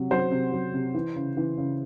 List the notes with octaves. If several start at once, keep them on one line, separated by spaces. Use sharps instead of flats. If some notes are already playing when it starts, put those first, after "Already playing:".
Already playing: C3 F#3
F#3 C5
C3
F#3
C3
E3
C#3
E3
C#3